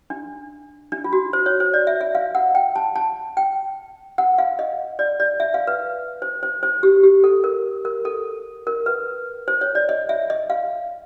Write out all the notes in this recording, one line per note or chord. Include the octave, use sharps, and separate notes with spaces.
D4
D4
F4
F#4
C5
C#5
C5
D5
E5
E5
F5
F#5
G5
A5
A5
G5
F#5
F5
D#5
D5
D5
E5
F5
B4
C5
C5
C5
G4
G4
A4
A#4
A#4
A4
A#4
B4
C5
C#5
D5
D#5
E5
D#5
F5